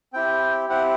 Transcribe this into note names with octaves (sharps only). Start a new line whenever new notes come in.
C4 E4 G4 G5
C4 E4 G4 F#5